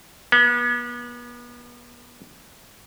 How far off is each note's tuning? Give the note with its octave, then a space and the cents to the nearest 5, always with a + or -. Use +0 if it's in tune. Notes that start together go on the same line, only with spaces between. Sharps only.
B3 -35